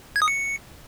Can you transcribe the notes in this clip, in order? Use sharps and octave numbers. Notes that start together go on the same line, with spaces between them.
G#6
D#6
C#7